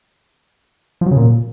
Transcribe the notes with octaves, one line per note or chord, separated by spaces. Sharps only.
F3
F#3
C#3
A#2